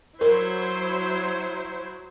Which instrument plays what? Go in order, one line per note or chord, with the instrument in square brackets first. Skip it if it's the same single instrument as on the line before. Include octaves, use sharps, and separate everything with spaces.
[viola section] F#3 E4 C5 [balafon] A#4